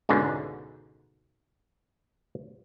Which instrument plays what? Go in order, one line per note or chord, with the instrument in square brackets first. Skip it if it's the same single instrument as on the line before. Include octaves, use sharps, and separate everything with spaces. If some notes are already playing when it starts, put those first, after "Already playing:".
[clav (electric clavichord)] C#2 G#2 B2 D3